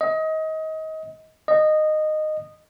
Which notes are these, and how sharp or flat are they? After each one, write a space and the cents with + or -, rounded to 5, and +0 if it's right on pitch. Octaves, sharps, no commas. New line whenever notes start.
D#5 +25
D#5 -15